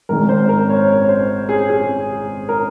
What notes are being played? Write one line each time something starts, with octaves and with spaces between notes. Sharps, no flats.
G#1 G#2 D#3 A#4
C5
A#4
C#5
C#5
C5
G#4
G#4
A#4